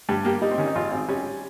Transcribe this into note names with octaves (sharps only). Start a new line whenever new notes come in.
G2 G4
A#3 G4
G3 D#4
C4
D#3 C#4
D#4
G#1 F4
G#1 C4
G3 C#4